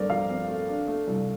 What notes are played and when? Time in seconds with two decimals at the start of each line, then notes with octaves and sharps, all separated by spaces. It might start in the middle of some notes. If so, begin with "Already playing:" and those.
Already playing: G2 A3 C4 A#4 D5
0.10 F3 F5
0.29 C4
0.48 A3
0.69 D4
0.88 A3
1.07 C2